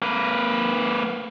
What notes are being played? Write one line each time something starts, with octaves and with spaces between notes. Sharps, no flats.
A#3 B4